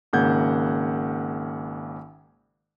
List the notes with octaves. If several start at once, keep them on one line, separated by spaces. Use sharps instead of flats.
G#1 C#3 A#3 F#5 G6 G#6